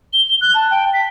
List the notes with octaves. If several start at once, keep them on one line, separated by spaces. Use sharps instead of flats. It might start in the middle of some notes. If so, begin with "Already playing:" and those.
G7
F#6
A5
G5
B6